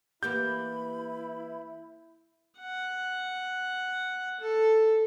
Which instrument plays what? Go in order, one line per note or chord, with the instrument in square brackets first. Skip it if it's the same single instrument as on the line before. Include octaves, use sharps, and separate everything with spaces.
[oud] E3 A#3 G4 [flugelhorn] E4 [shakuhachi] B5 [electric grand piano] G6
[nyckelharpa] F#5
A4